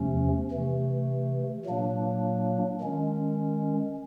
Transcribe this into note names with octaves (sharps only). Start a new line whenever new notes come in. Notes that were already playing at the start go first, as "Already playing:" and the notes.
Already playing: E2 C3 F3 A3 C#4
C3 E3 A3
A#2 F#3 A#3 D4
D#3 G#3 C#4